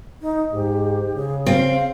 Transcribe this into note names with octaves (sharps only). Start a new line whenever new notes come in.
D#4
G#2 G4
C#3 G#4
C4 F5